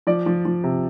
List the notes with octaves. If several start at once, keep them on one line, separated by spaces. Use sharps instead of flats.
F3 D5
F3
F3
C3